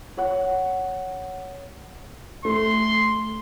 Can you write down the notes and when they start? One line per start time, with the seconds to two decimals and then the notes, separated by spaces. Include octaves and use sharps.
0.17 C#5 F#5
2.45 A3 C6